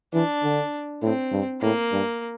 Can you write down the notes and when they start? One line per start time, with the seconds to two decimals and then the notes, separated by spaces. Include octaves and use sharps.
0.13 E3 D4
0.43 D3
1.02 A2 C4
1.32 G2
1.61 A2 A#3
1.92 G2